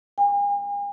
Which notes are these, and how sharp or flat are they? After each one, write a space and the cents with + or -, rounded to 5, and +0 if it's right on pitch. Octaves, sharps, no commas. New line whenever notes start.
G#5 -45